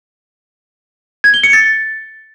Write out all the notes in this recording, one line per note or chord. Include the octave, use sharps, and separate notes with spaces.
G#6
G7
C#7
A6